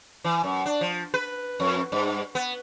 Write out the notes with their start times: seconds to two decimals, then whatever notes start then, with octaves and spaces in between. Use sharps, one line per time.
0.24 E3
0.44 F#2
0.66 D4
0.81 F3
1.14 B4
1.60 F2
1.92 G2
2.35 B3